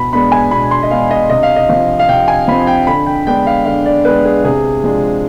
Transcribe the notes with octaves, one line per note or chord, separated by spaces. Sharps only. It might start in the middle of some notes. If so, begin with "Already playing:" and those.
Already playing: B2 B5
G#3 B3 D4 B5
G#5
B2 B5
C6
D#5
G#3 B3 D4 F5
D#5
C3 D#5
F5
D#5
F3 C4 F5
F5
C3 G5
G#5
F3 C4 B5
G5
D3 B5
G5
G#3 B3 D4 G5
F5
D3 F5
D5
G#3 B3 D4 B4
G#4
C3 G#4
F3 G#3 D4